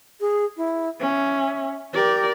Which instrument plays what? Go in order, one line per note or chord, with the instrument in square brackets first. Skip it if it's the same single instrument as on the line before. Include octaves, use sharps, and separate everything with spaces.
[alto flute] G#4
E4
[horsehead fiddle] C#4 [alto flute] E5
[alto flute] G4 [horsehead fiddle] A#4 D5